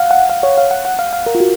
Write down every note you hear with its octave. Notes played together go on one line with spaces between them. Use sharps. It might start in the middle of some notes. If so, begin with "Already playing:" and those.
Already playing: F5 F#5
F#5
F5
C#5
F5
F#5
F#5
F5
F5
A#4
F4
F#4